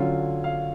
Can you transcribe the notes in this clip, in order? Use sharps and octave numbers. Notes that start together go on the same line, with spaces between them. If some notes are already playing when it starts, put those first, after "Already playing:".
Already playing: D3 F#3 C#4 F4 C#5
F5